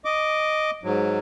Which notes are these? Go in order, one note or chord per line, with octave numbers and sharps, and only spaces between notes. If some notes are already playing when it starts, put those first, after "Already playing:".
D#5 D6
G#2 F#3